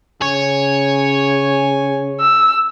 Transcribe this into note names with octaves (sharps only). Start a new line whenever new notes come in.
C#3 C#5 G#5
E6